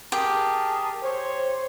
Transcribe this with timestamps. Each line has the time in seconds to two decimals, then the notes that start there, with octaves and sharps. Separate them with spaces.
0.12 G4 G#4 A#4 A5
1.03 C5 C#5